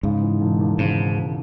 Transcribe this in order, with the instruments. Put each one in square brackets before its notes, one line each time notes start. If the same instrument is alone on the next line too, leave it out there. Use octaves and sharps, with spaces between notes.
[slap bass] G#2 [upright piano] C#3
[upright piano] E3
E1
D#2
[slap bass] G#2 [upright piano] C#3